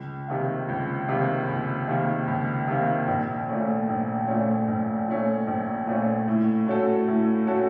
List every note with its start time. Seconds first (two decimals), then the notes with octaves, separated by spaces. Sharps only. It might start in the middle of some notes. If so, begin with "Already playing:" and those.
Already playing: C#2
0.28 C3 D#3 A#3
0.69 C#2
1.09 C3 D#3 A#3
1.48 C#2
1.88 C3 D#3 A#3
2.27 C#2
2.68 C3 D#3 A#3
3.07 A#1
3.48 A#2 A3 C#4
3.88 A#1
4.27 A#2 A3 C#4
4.68 A#1
5.08 A#2 A3 C#4
5.47 A#1
5.87 A#2 A3 C#4
6.28 A2
6.67 A3 C#4 F#4 A4
7.08 A2
7.47 A3 C#4 F#4 A4